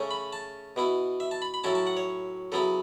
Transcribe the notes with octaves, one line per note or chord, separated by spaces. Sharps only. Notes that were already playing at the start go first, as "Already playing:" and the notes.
Already playing: C#3 A3 C#4
B5
A5
B2 B3 E4
E5
A5
B5
B5
A2 F#3 C#4 E4 A5
A5
F#5
C#5
C#3 F#3 B3 E4 A4